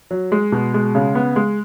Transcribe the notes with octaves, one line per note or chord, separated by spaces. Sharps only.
F#3
G#3
B2
G#3
C#3
B3
G#3